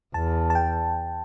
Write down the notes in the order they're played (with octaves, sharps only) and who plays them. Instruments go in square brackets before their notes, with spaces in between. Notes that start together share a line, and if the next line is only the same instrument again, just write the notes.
[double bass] E2 [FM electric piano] A5
[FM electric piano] A5
G5